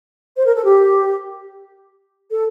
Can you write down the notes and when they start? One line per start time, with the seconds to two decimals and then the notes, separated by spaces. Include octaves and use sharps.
0.36 C5
0.46 A#4
0.55 A4
0.65 G4
2.31 A4